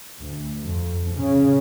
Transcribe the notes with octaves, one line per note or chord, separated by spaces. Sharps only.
D2
F2
C#3